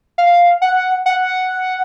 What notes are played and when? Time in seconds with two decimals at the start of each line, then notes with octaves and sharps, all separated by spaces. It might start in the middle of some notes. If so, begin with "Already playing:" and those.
0.18 F5
0.62 F#5
1.06 F#5